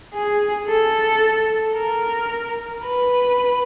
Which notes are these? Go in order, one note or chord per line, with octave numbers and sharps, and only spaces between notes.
G#4
A4
A#4
B4